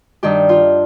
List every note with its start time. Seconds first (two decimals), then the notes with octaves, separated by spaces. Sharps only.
0.23 G2 D#3 G4
0.49 F4